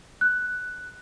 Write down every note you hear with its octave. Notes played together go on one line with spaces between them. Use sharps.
F#6